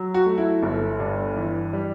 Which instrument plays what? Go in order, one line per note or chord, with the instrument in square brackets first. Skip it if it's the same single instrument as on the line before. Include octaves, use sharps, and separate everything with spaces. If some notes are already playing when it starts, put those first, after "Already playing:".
Already playing: [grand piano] F#3
F#4
A3
E4
G1
G2
E3
G3